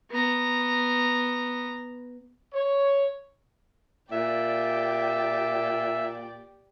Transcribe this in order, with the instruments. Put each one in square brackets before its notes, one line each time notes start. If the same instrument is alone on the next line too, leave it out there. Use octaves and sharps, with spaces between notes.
[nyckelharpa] B3 A#5
[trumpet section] C#5
[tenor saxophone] A#2 [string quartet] G4 D5 G5 [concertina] E5